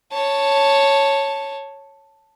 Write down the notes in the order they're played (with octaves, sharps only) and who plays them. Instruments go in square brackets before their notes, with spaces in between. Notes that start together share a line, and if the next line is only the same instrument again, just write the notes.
[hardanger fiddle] C#5 A5